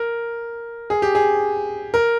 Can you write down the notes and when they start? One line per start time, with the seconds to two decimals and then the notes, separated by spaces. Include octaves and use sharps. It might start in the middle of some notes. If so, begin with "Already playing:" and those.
Already playing: A#4
0.90 G#4
1.02 G4
1.15 G#4
1.94 A#4